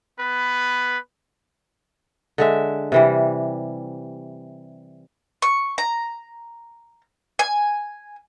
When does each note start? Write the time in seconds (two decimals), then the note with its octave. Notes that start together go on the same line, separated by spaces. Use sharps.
0.18 B3 B4
2.38 D3 G#3 E5
2.92 C3 E3 G3
5.42 C#6
5.78 A#5
7.39 G#5